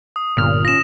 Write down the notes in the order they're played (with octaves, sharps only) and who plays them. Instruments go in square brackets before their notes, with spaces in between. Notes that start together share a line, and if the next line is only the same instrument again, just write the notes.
[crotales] D#6
[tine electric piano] G1 F6 [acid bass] A#2
[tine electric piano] C#4 F4 [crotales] A#6 E7